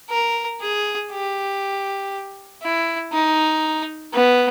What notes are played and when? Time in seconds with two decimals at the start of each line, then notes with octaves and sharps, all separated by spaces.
0.10 A#4
0.61 G#4
1.11 G4
2.62 E4
3.12 D#4
4.13 B3